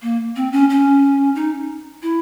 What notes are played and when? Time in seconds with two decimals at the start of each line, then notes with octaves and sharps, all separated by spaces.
0.02 A#3
0.36 C4
0.52 C#4
0.70 C#4
1.35 D#4
2.03 E4